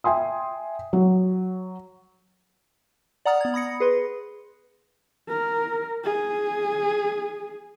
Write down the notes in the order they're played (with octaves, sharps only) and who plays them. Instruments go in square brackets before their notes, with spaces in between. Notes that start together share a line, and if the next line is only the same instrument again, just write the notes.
[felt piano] E5 G5 G#5 C6 D#6
F#3
[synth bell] D5 F#5 A#5 D#6 F6 A6
B3 G#6
B5 D#6 A#6 C#7
G#4 B4 C6
[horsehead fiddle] A#4
G#4